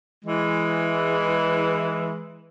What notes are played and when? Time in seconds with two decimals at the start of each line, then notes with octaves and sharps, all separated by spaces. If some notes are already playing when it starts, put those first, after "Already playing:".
0.24 E3 G#3